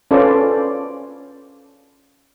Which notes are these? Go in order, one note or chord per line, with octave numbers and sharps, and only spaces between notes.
C#4 F4 A4 B4 C5 D5